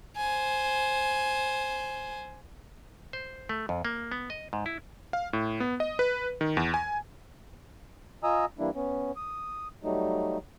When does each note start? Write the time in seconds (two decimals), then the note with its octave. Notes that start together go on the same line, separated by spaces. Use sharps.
0.17 C5 G#5
3.13 C5
3.49 A3
3.69 F2
3.85 A#3
4.12 B3
4.30 D#5
4.53 G#2
4.66 E4
5.13 F5
5.33 A2
5.60 B3
5.80 D#5
5.99 B4
6.41 D#3
6.57 E2
6.74 G#5
8.23 F4 D#5 G#5 A#5 D#6 E6
8.59 E3 G3 A#3 D4 E4
8.75 B3 C#4
9.16 D#6
9.84 F#3 G3 A3 D#4